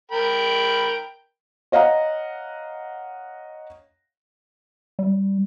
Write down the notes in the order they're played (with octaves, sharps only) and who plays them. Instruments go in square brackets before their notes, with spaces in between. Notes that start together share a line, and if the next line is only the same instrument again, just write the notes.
[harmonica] A#4 G5 B5
[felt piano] C#5 D#5 F5 F#5 A#5
[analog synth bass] G3